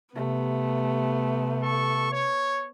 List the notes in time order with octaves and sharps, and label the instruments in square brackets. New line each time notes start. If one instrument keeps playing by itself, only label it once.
[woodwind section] C3 [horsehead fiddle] A3 [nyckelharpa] B3
[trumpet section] A4 C#6
C#5